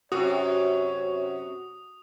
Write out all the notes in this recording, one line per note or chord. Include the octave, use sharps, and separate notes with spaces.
F#2 C3 F#4 C#5 D#6